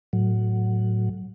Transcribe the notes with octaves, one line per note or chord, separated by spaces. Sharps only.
A2 F#3